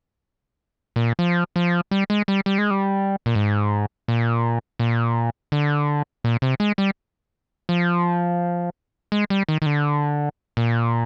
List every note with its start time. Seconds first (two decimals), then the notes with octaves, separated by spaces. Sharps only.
0.96 A#2
1.19 F3
1.56 F3
1.91 G3
2.10 G#3
2.28 G3
2.46 G3
2.58 G#3
2.71 G3
3.26 A#2
3.35 G#2
4.08 A#2
4.79 A#2
5.52 D3
6.24 A#2
6.42 C3
6.60 G#3
6.78 G3
7.69 F3
9.12 G#3
9.30 G3
9.49 D#3
9.62 D#3
9.66 D3
10.57 A#2